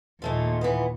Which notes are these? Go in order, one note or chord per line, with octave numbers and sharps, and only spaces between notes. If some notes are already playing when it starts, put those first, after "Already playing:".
D#2 A#2 G#3 A3 F4
E3 B3